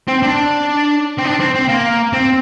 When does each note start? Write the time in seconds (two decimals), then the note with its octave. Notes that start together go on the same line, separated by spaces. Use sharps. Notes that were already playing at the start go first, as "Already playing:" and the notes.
0.08 C4
0.23 D4
1.19 C4
1.26 D4
1.40 C4
1.55 C4
1.69 A#3
2.13 C4